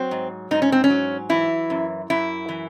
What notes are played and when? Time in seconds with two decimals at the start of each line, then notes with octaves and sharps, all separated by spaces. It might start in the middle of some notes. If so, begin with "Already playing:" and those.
Already playing: F#3 C4
0.11 G#2
0.51 G#2 D#4
0.62 C#4
0.72 C4
0.84 C#4
0.90 F#3
1.29 E3 E4
1.70 F#2
2.10 F#2 E4
2.49 E3